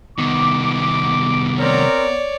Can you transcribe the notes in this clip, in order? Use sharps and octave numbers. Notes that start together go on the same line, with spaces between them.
C2 D#3 B3 D6
C4 A#4 C#5 D5